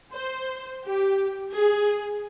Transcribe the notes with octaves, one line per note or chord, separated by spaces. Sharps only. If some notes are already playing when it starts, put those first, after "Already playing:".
C5
G4
G#4